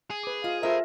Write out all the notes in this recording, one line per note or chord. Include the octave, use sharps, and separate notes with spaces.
G#4
B4 D6
F4 D#5 F5
F4 A4 A#4 C5 D#5 E5